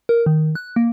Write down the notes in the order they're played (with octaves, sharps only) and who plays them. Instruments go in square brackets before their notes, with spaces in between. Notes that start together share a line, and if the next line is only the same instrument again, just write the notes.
[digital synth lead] A#4
D#3
F#6
A#3